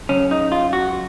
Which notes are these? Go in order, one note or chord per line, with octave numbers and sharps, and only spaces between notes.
F#2 C#3 C#4
D#4
F4
F#4